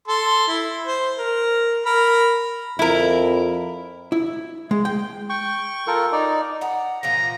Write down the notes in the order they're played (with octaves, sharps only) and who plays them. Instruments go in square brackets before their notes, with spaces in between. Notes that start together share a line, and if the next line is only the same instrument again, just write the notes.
[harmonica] A4 C6
E4
C5
A#4
A#4 B5
[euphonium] F2 [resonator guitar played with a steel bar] E4 A#4
[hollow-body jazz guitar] E4
G#3
G5
[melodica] G5 C#6
F4 A4 A#4
D#4 D5
[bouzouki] F#5 A#5
[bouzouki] A#2 E3 F3 [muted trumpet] A#5